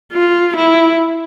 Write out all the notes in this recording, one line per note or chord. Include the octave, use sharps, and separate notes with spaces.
F4
E4